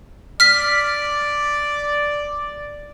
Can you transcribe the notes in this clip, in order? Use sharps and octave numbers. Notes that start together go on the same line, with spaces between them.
D5 F6 B6